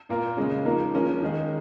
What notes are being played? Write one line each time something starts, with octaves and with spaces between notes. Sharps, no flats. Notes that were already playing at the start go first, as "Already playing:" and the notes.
A#2 A#3 F4 A#4
C#3 G#3 C#4
F3 A#3 D#4 A#4
F3 G#3 C#4 A#4
D#3 G#3 D#4 G#4